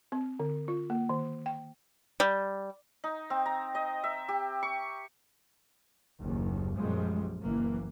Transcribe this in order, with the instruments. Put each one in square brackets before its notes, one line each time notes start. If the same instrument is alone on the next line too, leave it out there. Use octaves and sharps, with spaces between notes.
[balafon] C4
D3
F4
A#3
D#3
G5
[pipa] G3
[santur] D#4
C4
A#5
D#5
E5
G4
C#6
[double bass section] F#1 D#2
A#1 F#2 F3 G3 G#3
F#1 E3 A#3